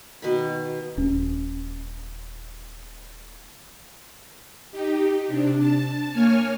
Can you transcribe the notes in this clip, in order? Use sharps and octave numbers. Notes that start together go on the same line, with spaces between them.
B2 D#3 B5
D#1 C#4
D#4 G4
C3 D4
A5
A#3 C#5 G#5 F6